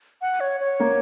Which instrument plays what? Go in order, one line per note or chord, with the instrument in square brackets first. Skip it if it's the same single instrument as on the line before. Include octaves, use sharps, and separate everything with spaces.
[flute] F#5
C#5
C#5
[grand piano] A#3 A#4